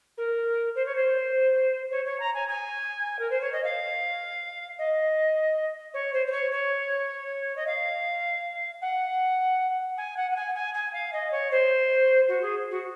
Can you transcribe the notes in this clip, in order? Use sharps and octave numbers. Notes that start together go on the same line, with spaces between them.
A#4
C5
C#5
C5
C#5
C#5
A#5
G#5
G#5
A#4
C5
C#5
D#5
F5
D#5
C#5
C5
C5
C#5
C#5
D#5
F5
F#5
G#5
F#5
F#5
G#5
G#5
G#5
F5
D#5
C#5
C5
F#4
G#4
F#4